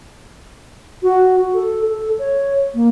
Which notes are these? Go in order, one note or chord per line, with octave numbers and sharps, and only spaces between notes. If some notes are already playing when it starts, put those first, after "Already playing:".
F#4
A4
A4
C#5
A#3